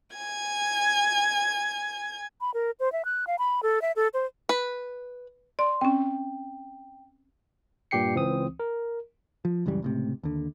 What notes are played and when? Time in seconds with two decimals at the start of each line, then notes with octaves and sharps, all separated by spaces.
0.16 G#5 G#6
2.41 B5
2.54 A#4
2.80 C5
2.92 E5
3.05 F#6
3.27 F5
3.39 B5
3.63 A4
3.82 E5
3.96 A4
4.14 C5
4.49 B4
5.59 D5 C6
5.81 C4 C#4 G5
7.91 G2 A#2 G4 G5 C7 C#7
8.15 C#2 E3 C4 D#6
8.60 A#4
9.45 F3
9.66 C#2 F#2 E3 G3
9.82 C#2 A2 C3
10.23 D#2 D3